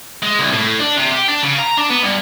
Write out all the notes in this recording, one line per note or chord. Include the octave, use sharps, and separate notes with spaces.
G#3
C2
A2
D4
C3
G4
D4
C#3
A#5
D4
B3
G2